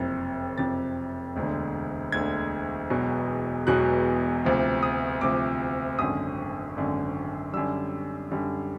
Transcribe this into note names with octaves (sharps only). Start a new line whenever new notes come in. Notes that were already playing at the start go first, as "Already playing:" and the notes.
Already playing: F#1 F2 C3
F#1 F2 C3 A6
E1 D2 D3
E1 D2 D3 G#6
E1 E2 B2 F#3
E1 E2 B2 F#3 F#6
D2 C3 F3
D#6
D2 C3 F3 D6
G#1 F#2 D3 D#6
G#1 F#2 D3
F#2 D3 G3 E6
F#2 D3 G3